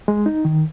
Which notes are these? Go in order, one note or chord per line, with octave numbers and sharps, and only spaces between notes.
G#3
D#4
D#3